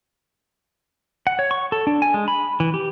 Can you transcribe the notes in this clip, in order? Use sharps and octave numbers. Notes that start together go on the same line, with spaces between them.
F#5
C#5
C#6
A4
D4
G#5
G#3
B5
E3
G4